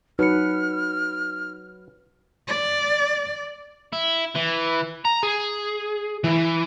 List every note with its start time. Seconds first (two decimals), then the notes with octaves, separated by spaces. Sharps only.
0.19 F#3 D#4 B4 F6 C#7
2.48 D5
3.93 E4
4.35 E3
5.05 A#5
5.23 G#4
6.24 E3